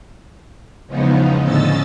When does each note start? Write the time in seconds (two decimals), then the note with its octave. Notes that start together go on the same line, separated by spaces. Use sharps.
0.87 E2 C#3 F3 G#3 B3 D#4
1.42 A2 D3 C#4 D#5 E6 A6